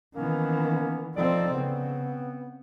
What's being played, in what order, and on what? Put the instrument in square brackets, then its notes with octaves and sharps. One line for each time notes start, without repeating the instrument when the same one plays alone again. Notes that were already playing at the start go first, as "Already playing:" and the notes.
[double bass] D#3 E3 [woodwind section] A#3 B3 C#4
[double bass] F3 C4 [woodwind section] D#4 A4 D5
[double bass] C#3 [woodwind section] B3 C4